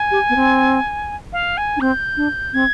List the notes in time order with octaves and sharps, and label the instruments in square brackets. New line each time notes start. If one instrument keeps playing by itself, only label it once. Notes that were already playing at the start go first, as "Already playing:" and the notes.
Already playing: [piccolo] G#5
[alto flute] G4
B3
C4
[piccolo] F5
G#5
[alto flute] D4
[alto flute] C4 [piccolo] G6
[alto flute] D4
[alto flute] C4 [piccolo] G#6